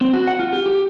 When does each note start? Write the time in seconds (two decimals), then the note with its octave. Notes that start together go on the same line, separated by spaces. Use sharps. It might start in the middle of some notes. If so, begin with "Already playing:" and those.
0.01 C4
0.13 F#4
0.28 F#5
0.39 F4
0.53 G4
0.66 G4